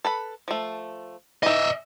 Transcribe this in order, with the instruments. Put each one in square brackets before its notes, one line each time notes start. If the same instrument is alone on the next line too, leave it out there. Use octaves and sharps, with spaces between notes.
[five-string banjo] A4 B4 B5
F3 A3
[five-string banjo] E3 D#4 [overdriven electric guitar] D#5 E5